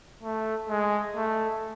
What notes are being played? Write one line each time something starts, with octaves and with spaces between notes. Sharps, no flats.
A3
G#3
A3